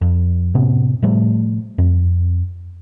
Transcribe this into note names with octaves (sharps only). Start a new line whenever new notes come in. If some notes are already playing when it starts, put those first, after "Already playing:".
F2
A2 C3 B3 C#4
A2 F3 G3 A3
F2